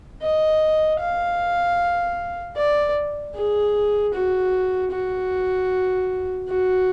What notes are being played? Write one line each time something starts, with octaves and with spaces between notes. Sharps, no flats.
D#5
F5
D5
G#4
F#4
F#4
F#4